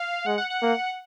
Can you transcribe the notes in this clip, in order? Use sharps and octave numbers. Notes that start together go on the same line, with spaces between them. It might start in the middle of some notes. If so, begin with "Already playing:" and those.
Already playing: F5
G#3 F#5
F#5
F#5
A#3